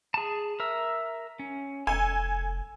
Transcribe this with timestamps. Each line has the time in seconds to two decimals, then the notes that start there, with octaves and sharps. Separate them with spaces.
0.14 G#4 A5
0.60 A#4 E5 E6
1.39 C#4
1.87 F1 A4 G#5